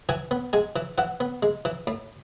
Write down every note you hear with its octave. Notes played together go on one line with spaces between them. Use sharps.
E3 G#5
B3
G#3 G#5
E3
E3 F#5
B3
G#3
E3
A2